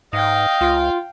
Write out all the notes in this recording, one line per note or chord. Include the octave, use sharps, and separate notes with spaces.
G#2 D#5 F5 G5
C#2 F4